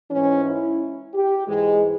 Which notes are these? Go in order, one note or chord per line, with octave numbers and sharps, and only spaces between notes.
G#2 E3 C#4
E4
G4
G#2 E3 G#3